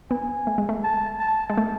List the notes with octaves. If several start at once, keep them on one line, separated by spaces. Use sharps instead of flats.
B3 G#5
A3
G#3
A3
A5
A5
G#3
A3